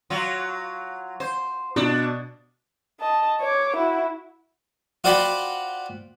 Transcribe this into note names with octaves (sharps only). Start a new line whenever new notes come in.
F#3 F4
C5
B2 D4
D#5 A5
C#5 D6
E4 F#4
F4 F#4 C5 D5 G5 B5